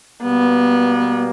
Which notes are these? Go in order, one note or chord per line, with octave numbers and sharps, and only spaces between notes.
B2 G3 A#3 B3